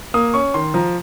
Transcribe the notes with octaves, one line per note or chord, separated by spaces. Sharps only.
A#3 D#6
C#4 C#6
D#3 C6
F3 A#5